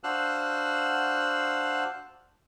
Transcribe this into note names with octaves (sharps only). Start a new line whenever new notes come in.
D4 F#4 C5 F5 E6 F#6